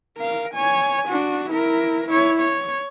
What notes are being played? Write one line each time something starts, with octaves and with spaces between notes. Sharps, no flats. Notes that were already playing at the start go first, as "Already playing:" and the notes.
A#4 F5
C#5 G#5
D4 F#4
E4 A#4
E4 C#5
C#5